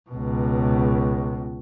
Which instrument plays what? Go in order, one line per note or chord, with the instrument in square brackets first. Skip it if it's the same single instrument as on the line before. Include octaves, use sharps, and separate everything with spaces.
[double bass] C#2 B2